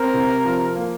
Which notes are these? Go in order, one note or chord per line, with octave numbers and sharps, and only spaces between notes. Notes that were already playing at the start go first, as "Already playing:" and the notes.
Already playing: C4 A#4
C3
F3
A#3